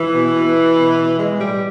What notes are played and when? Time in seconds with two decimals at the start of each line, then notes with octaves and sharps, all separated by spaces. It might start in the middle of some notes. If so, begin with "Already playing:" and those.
Already playing: E3
0.13 B2
0.35 B2
0.55 B2
0.76 B2
0.98 B2
1.19 E3 G#3
1.40 A2 G3